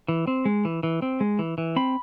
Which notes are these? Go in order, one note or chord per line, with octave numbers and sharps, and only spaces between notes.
E3
C4
G#3
E3
E3
C4
G#3
E3
E3
C4 B5